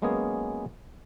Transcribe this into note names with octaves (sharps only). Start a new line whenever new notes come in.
F#3 G#3 A#3 B3 C#4 G#4